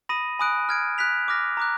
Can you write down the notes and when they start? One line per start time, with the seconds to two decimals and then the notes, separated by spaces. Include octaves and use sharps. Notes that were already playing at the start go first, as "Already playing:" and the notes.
0.09 B5 D#6 A#6 D#7
0.39 G#5 B5 D#6 F#6 D7
0.69 F6 G#6 D7
0.98 F#6 B6 F7
1.28 D6 F6 A#6
1.57 A#5 D6 F#6